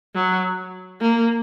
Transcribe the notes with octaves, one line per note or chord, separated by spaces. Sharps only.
F#3
A#3